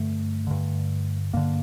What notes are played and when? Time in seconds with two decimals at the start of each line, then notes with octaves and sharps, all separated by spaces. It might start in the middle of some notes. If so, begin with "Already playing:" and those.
Already playing: G2 D3 A3
0.47 G2 D3
1.33 G2 D3 A#3